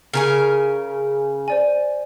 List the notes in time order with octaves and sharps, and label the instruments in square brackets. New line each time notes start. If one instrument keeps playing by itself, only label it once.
[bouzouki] C#3 A#4 G#5
[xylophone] C5 D5 G#5